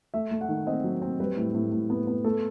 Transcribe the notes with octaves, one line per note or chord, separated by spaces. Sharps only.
A3 E5
A3
F#5
D#3
C4 D#5
F#3
C4
G3 B4
A2
A2
A2
B3
B3
A3 A4